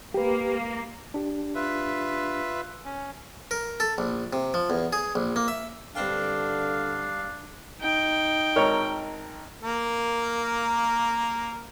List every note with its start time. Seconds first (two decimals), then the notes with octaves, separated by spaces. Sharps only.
0.14 A#3 G4 B4
1.14 D4 G4
1.55 F4 B4 E5
2.85 C#4
3.51 A#4
3.80 A4
3.98 A#1
4.33 C3
4.54 F3
4.70 E2
4.93 G#4
5.15 A#1
5.36 A#3
5.48 E5
5.95 G2 D3 C4 D4 F5 G5
7.81 D#4 G5
8.56 G#1 A#4 C#5
9.63 A#3 A#4